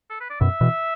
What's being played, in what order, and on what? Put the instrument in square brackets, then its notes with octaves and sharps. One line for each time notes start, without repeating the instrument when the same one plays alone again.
[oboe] A4
B4
D5
[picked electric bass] F#2 B2 [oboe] E5
[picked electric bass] B2 E3